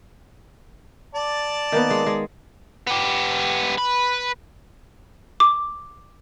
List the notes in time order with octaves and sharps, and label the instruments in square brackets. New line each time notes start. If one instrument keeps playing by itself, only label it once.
[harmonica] D5 A5
[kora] D#3 A#3 B3
G#3
G#3
[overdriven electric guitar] B3 G4
B4
[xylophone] D6